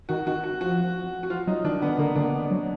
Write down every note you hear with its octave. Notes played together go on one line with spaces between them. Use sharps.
D#3 F#4
D#3 F#4
F#4
F3 F#4
F#4
F3 F4
F#3 D#4
D#3 D4
D3 B3
D3 A#3
D3 D4
B3
D4
F#3